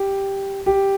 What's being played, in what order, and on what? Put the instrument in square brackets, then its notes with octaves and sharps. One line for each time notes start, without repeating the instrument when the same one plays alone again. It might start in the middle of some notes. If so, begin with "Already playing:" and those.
Already playing: [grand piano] G4
G4